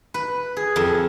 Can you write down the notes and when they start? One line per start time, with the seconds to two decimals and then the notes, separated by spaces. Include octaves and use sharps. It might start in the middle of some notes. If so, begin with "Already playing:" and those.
0.14 B4
0.57 G#4
0.76 F2